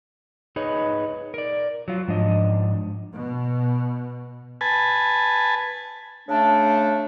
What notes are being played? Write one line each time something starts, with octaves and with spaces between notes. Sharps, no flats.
D#4 G#4 B4 C#5 D#5
A#4 D5
F#3 F4
G#2 F3 D4 D#5
B2
B4 G#5 A5
C#3 A3 D4